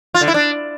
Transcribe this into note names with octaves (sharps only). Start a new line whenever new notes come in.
F4
D3
E4
D4